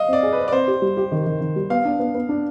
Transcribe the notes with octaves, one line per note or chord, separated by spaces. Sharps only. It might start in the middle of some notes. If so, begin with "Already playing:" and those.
Already playing: D#5 F5
C4 D5
G#4
B4 C5
D5
C4 C5
G4
G3
G4
D#3
D#3
D#3
G3
B3 F5
D4
B3
B3
D4